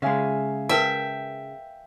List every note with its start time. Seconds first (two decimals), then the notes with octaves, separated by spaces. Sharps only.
0.02 C#3 G#3 E5 F5 G#5
0.69 A#4 B4 E5 G5 A5